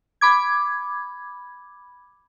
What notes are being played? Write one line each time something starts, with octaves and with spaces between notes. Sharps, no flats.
B5 D6 G#6